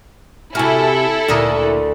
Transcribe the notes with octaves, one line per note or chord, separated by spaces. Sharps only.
C3 E4 F#4 A4 G#5 F6
D2 A#2 D3 A#4 D#6 C#7